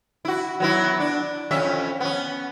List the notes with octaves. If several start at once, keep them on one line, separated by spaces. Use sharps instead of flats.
E4 F#4
F#3 B3 E4
D4
F2 C#4 E5
B3 C#4